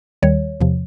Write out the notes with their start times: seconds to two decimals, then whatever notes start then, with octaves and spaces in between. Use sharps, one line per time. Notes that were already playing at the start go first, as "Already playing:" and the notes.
0.23 D#2 D#3 G3 C#5
0.61 E2 C3 F3